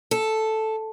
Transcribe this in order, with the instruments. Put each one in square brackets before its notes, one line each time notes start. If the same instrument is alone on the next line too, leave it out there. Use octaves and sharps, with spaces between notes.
[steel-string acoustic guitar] A4